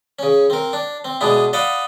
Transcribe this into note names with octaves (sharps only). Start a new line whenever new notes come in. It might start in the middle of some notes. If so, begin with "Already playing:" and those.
C#3 C#4
C4 A#4
D4
C4
B2 G#3 B3 D4 E4
D5 D#5 F5 F#5 B5